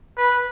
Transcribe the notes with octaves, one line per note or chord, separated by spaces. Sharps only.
B4